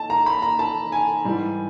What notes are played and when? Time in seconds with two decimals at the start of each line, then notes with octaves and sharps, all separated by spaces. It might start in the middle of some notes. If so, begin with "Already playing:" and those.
Already playing: D#3 A5
0.10 A#5
0.26 B5
0.42 A#5
0.59 A5
0.92 G#5
1.25 G#2 E3 G3